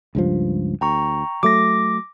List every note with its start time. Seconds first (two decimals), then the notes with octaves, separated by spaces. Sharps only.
0.15 C#2 G2 F3
0.81 D2 G5 A#5 C#6
1.43 F#3 A3 D6 A#6